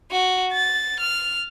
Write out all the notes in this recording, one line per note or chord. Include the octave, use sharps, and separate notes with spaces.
F#4
A6
F6